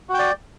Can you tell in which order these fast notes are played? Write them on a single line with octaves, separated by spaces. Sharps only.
F#4 G5 D5